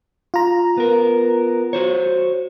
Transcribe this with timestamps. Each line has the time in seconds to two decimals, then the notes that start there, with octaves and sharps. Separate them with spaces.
0.34 F4 A#5
0.77 B3 A#4
1.73 F#4 C5 C#5